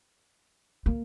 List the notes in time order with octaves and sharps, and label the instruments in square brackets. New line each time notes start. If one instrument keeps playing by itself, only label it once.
[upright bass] A#3